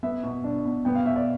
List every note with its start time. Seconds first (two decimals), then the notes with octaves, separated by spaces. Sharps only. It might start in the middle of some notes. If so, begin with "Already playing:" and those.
0.03 B3 E5
0.24 B2
0.44 D4
0.65 B2
0.85 B3 G5
0.95 F5
1.05 B2 E5
1.16 D5